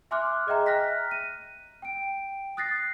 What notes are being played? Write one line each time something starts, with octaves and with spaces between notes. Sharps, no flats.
E5 G#5 C6 D6 F6 F#6
G#4 D#5 E5 G5 A#5
F6 F#6 A#6 B6
D#7
G5 D7
D#6 F#6 A6 A#6 C7